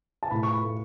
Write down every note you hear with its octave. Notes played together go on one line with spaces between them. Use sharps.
A5
A2 B5
C#6
B5
A3